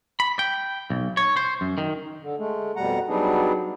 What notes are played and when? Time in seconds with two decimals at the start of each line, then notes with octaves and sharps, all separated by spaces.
0.20 B5
0.39 G5
0.90 B1
1.17 C#5
1.37 C5
1.61 F#2
1.78 D#3
2.23 D3
2.38 G#3 A3
2.76 F2 B2 G3 F#5 A#5
3.08 F#3 G3 B3 D4 D#4 G#4